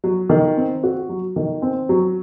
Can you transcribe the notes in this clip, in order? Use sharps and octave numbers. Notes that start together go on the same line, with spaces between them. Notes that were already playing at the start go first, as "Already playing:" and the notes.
F#3
D#3
C4
F#4
F#3
D#3
C4
F#3